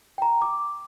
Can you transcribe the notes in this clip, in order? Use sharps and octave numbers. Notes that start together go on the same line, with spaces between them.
G5 A#5
D6